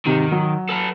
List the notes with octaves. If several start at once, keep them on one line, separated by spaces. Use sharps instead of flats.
G#2 C3 D#3
F#3
A4 B4